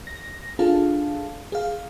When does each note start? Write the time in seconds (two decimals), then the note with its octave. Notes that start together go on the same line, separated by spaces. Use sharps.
0.07 A#6
0.59 D4 F4 G#4 A4 F5 A5
1.52 G#4 F5